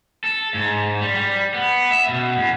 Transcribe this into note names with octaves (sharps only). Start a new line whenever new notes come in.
A4
G#2
G3
G3
B3
E5
B2
E2